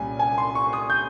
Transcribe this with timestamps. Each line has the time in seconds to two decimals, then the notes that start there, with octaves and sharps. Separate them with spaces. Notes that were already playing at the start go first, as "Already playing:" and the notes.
Already playing: C2 A#2 G3 C#4 G#5
0.19 G#5
0.38 C6
0.55 C#6
0.73 D#6
0.90 G6